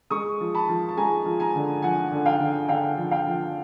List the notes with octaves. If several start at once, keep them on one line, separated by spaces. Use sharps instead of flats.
G#3 C#6 D#6
F3
A5 B5
F3
A5
G#3 G#5 A#5
F3
G#5 A#5
D3
F3 F#5 G#5
D3
F5 G5
D3
D3 F5 G5
F3
F5 G5
F3